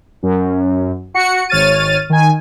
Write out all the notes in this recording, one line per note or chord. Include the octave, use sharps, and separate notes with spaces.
F#2
F#4 C#7
G#1 C#5 F6 A6 D#7
D#3 G#5